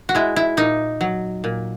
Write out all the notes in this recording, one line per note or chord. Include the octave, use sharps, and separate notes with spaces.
F#4
G#3 E4
E4
A#2 D#4
F#3
A#2